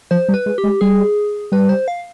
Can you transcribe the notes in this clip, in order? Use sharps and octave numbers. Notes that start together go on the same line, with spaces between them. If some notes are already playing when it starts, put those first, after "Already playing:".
F3 C5
G3
B4
G#3
G4
G#3
G3 G#4
G3 B4
C5
F5